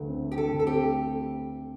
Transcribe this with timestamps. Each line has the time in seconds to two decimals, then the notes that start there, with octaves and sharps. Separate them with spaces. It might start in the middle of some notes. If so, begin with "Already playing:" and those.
Already playing: D2 D3 A3
0.08 C4
0.22 A3
0.32 G4
0.37 D3 A4
0.52 D2
0.59 A4
0.67 C4 G4
0.82 A3